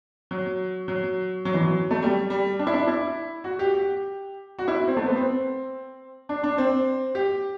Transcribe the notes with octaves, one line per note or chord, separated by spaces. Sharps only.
F#3
F#3
F#3
E3
F#3
A3
G3
G3
D4
E4
D4
E4
F#4
G4
G4
F#4
E4
C4
A3
B3
C4
D4
D4
C4
G4